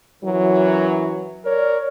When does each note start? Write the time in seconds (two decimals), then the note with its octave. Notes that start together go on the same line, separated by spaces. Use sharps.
0.23 F#2 E3 F#3
1.45 A#4 C#5 D5